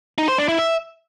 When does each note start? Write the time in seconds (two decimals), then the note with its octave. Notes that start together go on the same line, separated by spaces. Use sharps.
0.18 D#4
0.28 C5
0.38 D4
0.48 E4
0.58 E5